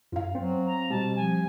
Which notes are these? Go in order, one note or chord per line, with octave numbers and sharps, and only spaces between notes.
F#2 F4 F5
F#3 C4 C5
A#5
B2 G3 A5
F3 G#5